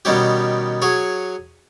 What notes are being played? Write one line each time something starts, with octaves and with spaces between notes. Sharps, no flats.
B2 D#3 G3 C#4 G4
F#3 G#4 C#5